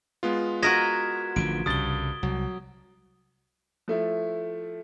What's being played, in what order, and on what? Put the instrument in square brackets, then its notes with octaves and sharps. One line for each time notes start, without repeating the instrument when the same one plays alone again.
[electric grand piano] G#3 B3 F4
[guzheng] F#4 A#4 D#5 [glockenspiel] G#6 B6 E7
[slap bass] A1 D3 F3 [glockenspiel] D7
[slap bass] C2 C#3 [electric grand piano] G2 A6 [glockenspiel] D#6 G7
[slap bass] C2 [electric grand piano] F#3
[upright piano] F3 A3 E4